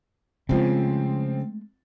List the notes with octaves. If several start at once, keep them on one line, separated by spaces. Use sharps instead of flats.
C#3 F3 G#3 A3 C4